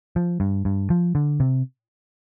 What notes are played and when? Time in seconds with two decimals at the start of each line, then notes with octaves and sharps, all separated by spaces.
0.16 F3
0.40 G2
0.65 G2
0.90 F3
1.15 D3
1.40 C3